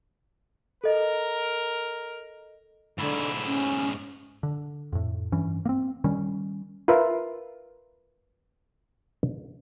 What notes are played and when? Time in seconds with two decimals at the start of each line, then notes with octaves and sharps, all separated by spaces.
0.84 A4 A#4 D#5
2.98 G#2 D3 E4
3.46 C#4
4.43 D3
4.92 F2 A2
5.32 G2 E3 C#4
5.65 A#3 C4
6.04 D#3 G3 C#4
6.88 F4 A#4 B4 E5